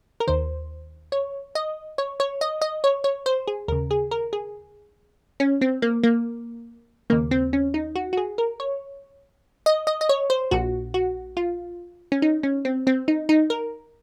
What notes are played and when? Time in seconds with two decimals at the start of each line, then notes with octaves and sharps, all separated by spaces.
0.20 A#4
0.27 D#2 D#3 C5
1.12 C#5
1.55 D#5
1.98 C#5
2.20 C#5
2.41 D#5
2.62 D#5
2.84 C#5
3.04 C#5
3.26 C5
3.48 G#4
3.68 D#2 C#3 A#4
3.91 G#4
4.11 A#4
4.33 G#4
5.40 C#4
5.61 C4
5.82 A#3
6.04 A#3
7.10 D#2 C#3 A#3
7.31 C4
7.53 C#4
7.74 D#4
7.95 F#4
8.13 F#4
8.17 G#4
8.38 A#4
8.60 C#5
9.66 D#5
9.87 D#5
10.01 D#5
10.09 C#5
10.30 C5
10.51 A#1 A#2 F#4
10.94 F#4
11.37 F4
12.12 C#4
12.22 D#4
12.43 C#4
12.65 C4
12.87 C4
13.08 D#4
13.29 D#4
13.50 A#4